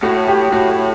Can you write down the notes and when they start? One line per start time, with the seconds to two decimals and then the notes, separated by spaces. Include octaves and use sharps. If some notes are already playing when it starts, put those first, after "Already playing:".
0.03 A2 F#4
0.28 G4
0.52 A2 F#4